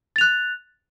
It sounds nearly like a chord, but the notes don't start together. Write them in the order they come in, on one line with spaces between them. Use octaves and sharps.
A6 F7 F#6